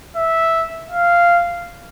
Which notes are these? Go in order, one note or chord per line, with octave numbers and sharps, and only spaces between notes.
E5
F5